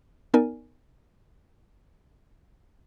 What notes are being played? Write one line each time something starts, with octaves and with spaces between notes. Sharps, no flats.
B3 D#4 A#4 D5 G#5